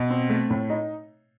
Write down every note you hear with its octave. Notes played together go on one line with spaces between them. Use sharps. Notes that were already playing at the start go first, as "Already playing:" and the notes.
Already playing: B2
C4
A3
A2
D#4